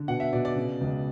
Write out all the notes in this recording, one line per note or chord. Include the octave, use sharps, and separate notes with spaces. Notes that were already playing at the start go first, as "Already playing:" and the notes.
Already playing: D3
B2 F#5
E5
B2 D5
D5
C#3
C#2